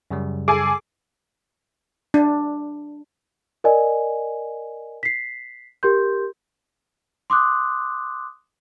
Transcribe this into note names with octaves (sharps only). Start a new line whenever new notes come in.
F#2 C#3 G3
G#4 A4 G#5 D6
D4
A#4 D5 D#5 G#5
B6 C7
G4 A#4 C6 G6
C6 D6 D#6 F#6